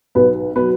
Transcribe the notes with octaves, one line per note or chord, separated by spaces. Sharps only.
B1 B3 B4
B2 F#3 B3 B4